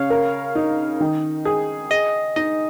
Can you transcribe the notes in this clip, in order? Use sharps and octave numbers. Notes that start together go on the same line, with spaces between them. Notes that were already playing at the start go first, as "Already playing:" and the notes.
Already playing: C#3 C#5 F5
A#4
D#4
D#3
G#4
G#4 D#5
D#4 D#5